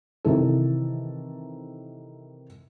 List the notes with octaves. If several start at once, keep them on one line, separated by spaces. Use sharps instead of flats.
C3 D#3 E3 A4